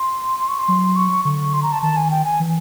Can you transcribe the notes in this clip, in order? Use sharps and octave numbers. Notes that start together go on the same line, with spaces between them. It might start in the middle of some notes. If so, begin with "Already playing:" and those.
Already playing: C6
C6
C#6
C6
F#3
C#6
D3 C#6
C6
A#5
A5
D#3 A5
G#5
G5
G#5
E3